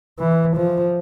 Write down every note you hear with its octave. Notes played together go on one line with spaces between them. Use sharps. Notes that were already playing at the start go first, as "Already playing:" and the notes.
E3
F3